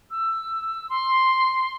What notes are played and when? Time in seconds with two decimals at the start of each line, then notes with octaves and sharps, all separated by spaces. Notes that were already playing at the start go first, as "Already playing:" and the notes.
0.11 E6
0.89 C6